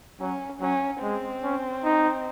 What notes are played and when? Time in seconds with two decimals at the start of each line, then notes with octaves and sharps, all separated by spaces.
0.20 F#3 C#4
0.61 F#3 C#4
1.01 G#3 C4
1.43 C#4
1.84 D#4